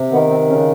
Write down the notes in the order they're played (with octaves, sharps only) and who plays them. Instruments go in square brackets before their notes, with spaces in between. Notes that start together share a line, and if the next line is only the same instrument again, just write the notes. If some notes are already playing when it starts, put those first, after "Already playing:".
Already playing: [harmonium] C3
D#3 B3
C4
C#3 C#4